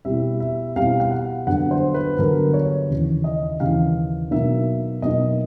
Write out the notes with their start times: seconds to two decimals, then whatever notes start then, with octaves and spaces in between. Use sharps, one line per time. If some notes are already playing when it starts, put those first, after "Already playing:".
0.05 B2 G3 C4 E4 E5
0.40 E5
0.76 B2 G3 C4 E4 F5
1.00 F5
1.11 F#5
1.47 G2 D3 F#3 B3 D4 F#5
1.71 C5
1.94 B4
2.18 G2 D3 F#3 B3 D4 A#4
2.54 C#5
2.90 D#2 C#3 E3
3.24 D#5
3.60 D#2 C#3 E3 F5
4.31 B2 F#3 A#3 D#4 E5
5.02 B2 F#3 A#3 D#4 D#5